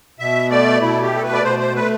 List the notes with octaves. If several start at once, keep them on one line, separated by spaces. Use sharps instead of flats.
B2 E5
A3 D5
B2 E4
G4
A3 A4
B4
D5
B2 C5
C5
A3 B4